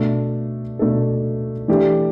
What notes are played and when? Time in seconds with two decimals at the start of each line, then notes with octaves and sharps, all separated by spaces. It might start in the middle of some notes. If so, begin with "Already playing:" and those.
Already playing: B2 A3 D4 A4
0.79 B2 A3 D4 A4
1.68 E3 A3 D4 G4